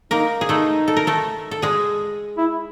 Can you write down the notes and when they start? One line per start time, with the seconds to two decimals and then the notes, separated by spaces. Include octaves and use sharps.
0.11 A#3 D#4 A#4
0.41 G#4
0.49 A3 D#4 A4
0.88 A4
0.97 A#4
1.07 A3 A4
1.51 A4
1.62 G#3 G#4
2.38 E4